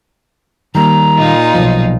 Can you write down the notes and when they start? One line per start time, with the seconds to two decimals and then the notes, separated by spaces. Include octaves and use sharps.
0.75 D#3 G3 A#3 A#5
1.17 A#2 D#4 F4
1.54 B1 E2 F3